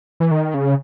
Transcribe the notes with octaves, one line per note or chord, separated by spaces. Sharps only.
E3
D#3
C#3